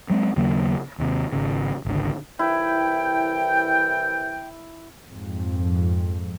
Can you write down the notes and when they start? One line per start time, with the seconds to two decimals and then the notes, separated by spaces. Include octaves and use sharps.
0.10 F#3 G#3 C4
0.36 D#2 C#3 F#3 A#3
0.98 D#2 C3
1.32 G#1 C#3
1.85 G#1 C#2 D3
2.39 C2 E3 E4 G5
5.10 F2 G#2